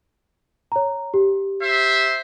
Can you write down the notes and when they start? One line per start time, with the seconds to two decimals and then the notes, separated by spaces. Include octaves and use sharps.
0.72 C#5 A#5
1.14 G4
1.62 C5 E5